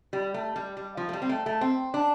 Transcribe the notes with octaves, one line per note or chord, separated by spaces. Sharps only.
G3
A3
G3
G3
F3
A3
G3
C4
A3
A3
C4
D4